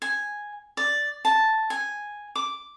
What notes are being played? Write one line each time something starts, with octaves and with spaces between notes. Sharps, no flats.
G#5
D5
A5
G#5
D6